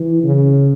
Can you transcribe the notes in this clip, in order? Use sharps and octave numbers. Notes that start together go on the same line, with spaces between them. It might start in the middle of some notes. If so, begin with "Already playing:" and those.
Already playing: E3
C#3